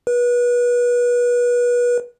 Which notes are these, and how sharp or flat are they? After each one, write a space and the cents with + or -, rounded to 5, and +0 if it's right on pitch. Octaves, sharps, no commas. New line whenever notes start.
B4 -30